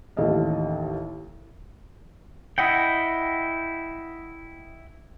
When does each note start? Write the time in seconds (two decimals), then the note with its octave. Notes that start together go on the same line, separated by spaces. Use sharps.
0.17 A1 D#2 A4 D#5 F5
2.58 E4 D#5 F#5 G5